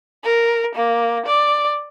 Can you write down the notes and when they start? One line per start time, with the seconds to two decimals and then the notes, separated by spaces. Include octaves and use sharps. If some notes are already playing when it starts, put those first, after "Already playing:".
0.24 A#4
0.75 A#3
1.26 D5